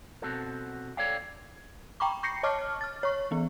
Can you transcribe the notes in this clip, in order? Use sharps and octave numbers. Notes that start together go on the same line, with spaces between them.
B2 C4 F#4 A4
A4 C#5 D5 F5 G5
G5 A#5 B5 C#6 D6
C#6 G6 A#6 C7 C#7
C#5 D#5 A5 C#6 D6 F6
F6 A6
C#5 C#6
E3 B3